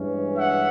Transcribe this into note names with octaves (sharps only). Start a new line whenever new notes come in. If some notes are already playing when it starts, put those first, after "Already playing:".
Already playing: G2 E3 G#3 C#4
E5 F#5